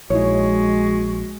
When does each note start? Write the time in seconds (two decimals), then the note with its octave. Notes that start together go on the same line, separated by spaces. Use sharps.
0.10 A#1 G#3 D#4 E4 F#4 C#5